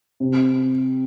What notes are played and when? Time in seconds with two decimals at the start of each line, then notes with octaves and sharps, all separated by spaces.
0.20 C3